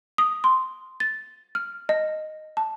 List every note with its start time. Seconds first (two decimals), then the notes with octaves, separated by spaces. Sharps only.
0.18 D#6
0.44 C6
1.00 A6
1.55 F6
1.89 D#5
2.57 A5